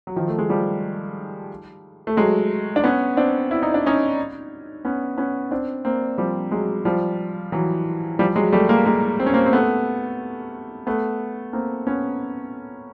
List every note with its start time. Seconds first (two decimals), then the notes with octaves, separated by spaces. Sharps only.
0.07 F#3
0.16 D#3 F3
0.28 A3
0.39 G#3
0.49 F3 G3
2.07 A3
2.17 F#3 G#3
2.76 D4
2.84 B3 C#4
3.17 C4 D4
3.51 E4
3.63 D#4
3.74 D4
3.86 C#4 D#4
4.85 B3 C#4
5.18 B3 C#4
5.51 C4 D4
5.85 A#3 C4
6.18 F3 G3
6.51 F#3 G#3
6.85 F3 G3
7.52 E3 F#3
8.19 F3 G3
8.36 F#3 G#3
8.52 G3 A3
8.69 G#3 A#3
8.86 G#3 A#3
9.20 C4
9.26 C#4
9.34 A#3 C4
9.46 C4
9.53 A3 B3
10.87 A3 B3
11.53 A#3 C4
11.87 B3 C#4